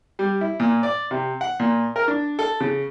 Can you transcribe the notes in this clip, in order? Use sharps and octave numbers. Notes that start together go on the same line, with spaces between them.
G3
E4
A#2
D5
C3
F#5
A#2
A#4
D4
A4
C#3